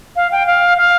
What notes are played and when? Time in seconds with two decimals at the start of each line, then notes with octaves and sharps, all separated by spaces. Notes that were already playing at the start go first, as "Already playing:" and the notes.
0.16 F5
0.32 G5
0.47 F5
0.78 F5